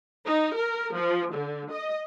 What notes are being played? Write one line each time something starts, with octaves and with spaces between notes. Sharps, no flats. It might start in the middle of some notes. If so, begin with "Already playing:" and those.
D#4
A#4
F3
D3
D#5